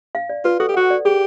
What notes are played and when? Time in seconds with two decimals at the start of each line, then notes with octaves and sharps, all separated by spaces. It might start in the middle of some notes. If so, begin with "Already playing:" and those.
0.15 F5
0.30 D5
0.44 F4 B4
0.60 F#4 A4
0.69 G4
0.74 F#4 F#5
0.90 D5
1.05 G4 G#4